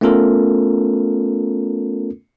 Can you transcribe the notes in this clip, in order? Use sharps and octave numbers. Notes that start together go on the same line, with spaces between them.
A3 B3 C#4 F4 A4 A#4